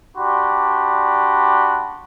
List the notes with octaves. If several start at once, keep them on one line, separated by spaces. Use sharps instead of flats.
D4 F#4 G4 D5 B5 C6